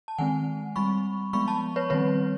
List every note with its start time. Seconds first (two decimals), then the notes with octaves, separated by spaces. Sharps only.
0.08 A5
0.18 D#3 G#3 C4 F#5 G#5
0.76 G3 C4 B5 C#6
1.33 F3 G#3 B3 B5 C#6
1.48 A5 B5
1.76 B4 C#5
1.90 D#3 G3 C4 B4 C#5